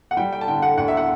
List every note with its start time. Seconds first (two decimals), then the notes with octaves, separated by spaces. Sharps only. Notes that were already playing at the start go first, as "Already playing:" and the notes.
0.11 F#5
0.17 G3 G5
0.33 G5
0.41 A5
0.48 D3 G5
0.62 F#5
0.77 D2 F#5
0.88 E5
0.97 F#5